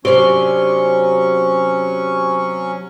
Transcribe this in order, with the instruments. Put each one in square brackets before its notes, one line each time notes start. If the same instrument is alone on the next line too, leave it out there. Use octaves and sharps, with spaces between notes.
[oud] C3 D4 [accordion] F#3 C#4 C#6 [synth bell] G4 C5